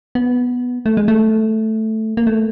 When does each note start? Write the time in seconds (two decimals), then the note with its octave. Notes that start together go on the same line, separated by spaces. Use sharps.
0.15 B3
0.86 A3
0.97 G#3
1.08 A3
2.17 A#3
2.27 A3